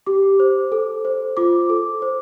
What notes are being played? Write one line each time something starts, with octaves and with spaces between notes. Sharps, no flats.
G4 D6
C5
A4
C5
F4 D6
A4
C5